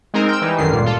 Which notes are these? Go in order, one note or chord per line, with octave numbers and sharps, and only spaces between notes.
G#3 C4 D#4 A#4
G5 E6
E3 G3 D#4
G#1 F#2 D3 D#3 C7
C#2 G2 A#2
F4 A4